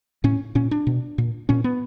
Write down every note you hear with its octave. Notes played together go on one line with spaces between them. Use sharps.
A2 C#4
A#2 C#4
D4
B2
A#2
A#2 C#4
B3